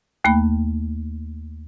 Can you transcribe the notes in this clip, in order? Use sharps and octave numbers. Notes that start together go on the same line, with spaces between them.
D#2 A3 A#3 G5 B5